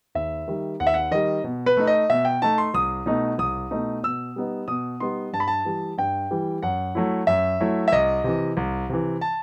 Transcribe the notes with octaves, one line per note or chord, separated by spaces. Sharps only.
D#2 E5
D#3 G3
D#2 F#5
E5
F#5
D#3 G3 D#5
B2
B4
A3 D#4
D#5
B2 E5
G5
A3 D#4 A5
C6
C2 D#6
B2 A3 D#4
C2 D#6
B2 A3 D#4
B2 E6
G3 B3 D#4
B2 D#6
G3 B3 D#4 C6
G2 A5
B5
A5
E3 G3
G2 G5
E3 G3
F#2 F#5
F#3 A3 E4
F#2 E5
F#3 A3 E4
E5
C2 D#5
C3 E3
C2
C3 E3
A5